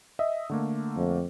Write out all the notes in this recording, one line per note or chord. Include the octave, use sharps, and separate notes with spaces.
D#5 E5
D3 A3 A#3
F2